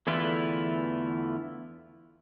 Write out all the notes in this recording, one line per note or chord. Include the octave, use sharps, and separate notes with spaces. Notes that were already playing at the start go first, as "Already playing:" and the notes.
E2 D3 E3 A3 E4 F4